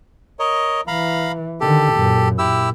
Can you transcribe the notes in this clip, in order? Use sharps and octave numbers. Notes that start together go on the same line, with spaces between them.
A#4 C#5 D#5
E3 F5 A#5 B5
D3 D#3 G4 A4
F#2 A#2
A#2 E4 G4 E6